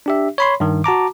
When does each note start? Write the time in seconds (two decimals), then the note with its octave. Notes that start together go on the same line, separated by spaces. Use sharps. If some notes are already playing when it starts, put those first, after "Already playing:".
0.06 D4 G4 E5
0.38 C#5 B5 C6
0.60 G2 D#3
0.84 F#4 A5 A#5 D6